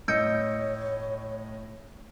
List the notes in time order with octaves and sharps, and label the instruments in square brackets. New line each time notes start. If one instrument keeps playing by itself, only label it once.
[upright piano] A2 D#5 [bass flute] C#5 [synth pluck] E6 G6 C#7